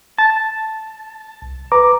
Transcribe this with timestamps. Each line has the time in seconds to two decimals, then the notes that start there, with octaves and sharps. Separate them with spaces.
0.18 A5
1.42 C2
1.72 B4 A#5 D6